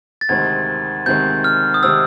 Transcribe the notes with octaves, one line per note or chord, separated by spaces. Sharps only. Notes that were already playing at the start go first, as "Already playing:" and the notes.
A6
D2 C3 D#3 G#3 C4 G#6
D2 C3 D#3 G#3 C4 G6
F6
D#6
C3 D#3 G#3 C4 E6